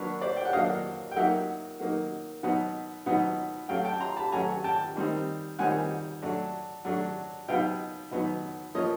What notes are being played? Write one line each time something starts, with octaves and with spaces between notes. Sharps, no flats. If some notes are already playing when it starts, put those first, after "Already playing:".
Already playing: F#3 A#3 D4 B4 C#5
C5 D5
G5
F#5
F#3 A#3 D4 D#5 F5
G5
F#3 A#3 D#4 E5 F#5
F#3 A#3 D#4
B2 F#3 B3 D#4
B2 F#3 B3 D#4
F#3 A3 C#4 F5 G5
G5 A5
A#5 C6
A5 B5
F#3 A3 C#4 G#5 A#5
G5 A5
D#3 G3 C4 D#4
D#3 G3 C4 D#4 F#5 G#5
F#3 A3 D4
F#3 A3 D4
B2 F#3 B3 D#4 F5 G5
B2 F#3 B3 D#4
F3 A#3 C#4 C#5 D#5